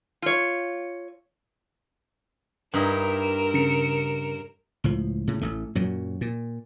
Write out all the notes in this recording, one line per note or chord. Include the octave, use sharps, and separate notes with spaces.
F4 C#5
G2 D#4 E4 A#4 E7
C#3 C#7
C#2 A2 F3
A2 C#3
A1 A3
F#2 A#2 F#3
A#2